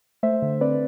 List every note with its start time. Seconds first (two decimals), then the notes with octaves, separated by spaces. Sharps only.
0.23 A3 C5 E5
0.42 D3
0.61 C4 B4 D5